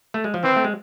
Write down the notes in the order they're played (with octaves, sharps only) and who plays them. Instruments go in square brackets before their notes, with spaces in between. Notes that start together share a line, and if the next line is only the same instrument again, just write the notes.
[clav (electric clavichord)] A3
G#3
F3
[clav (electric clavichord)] E3 [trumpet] C4
[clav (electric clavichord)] A3
G#3